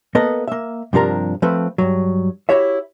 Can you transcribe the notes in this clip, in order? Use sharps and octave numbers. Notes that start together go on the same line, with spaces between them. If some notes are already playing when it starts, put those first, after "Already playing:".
A#3 B3 A4 B4 D#5
A#3 E5
G2 C3 F3 D4 A#4 A#5
F3 A3 C4 B4
G2 F#3
E4 F#4 G4 C#5 E5